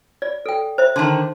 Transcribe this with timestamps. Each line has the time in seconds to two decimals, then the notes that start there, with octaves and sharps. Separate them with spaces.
0.22 D5
0.46 A4 G5
0.78 C5 E5
0.96 D3 D#3 A5 C6